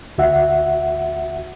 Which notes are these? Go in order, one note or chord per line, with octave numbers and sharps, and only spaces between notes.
D2 F#4 E5 F#5